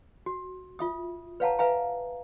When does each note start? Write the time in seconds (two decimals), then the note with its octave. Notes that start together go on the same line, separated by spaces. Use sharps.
0.26 F#4
0.79 F4 E5 D#6
1.40 B4 C#5 F5 F#5 A5 A#5
1.59 B4 E5 F5 G#5 A#5